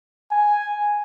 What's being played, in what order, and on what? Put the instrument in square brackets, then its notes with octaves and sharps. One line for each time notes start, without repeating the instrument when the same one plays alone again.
[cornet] G#5